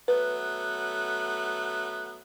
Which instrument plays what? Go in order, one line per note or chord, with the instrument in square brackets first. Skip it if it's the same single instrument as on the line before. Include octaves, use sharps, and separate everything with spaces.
[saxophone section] F#3 A3 B3 [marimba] B4